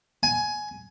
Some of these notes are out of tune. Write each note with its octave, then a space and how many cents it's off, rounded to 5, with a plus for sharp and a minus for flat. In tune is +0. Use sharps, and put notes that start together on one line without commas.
G#5 +15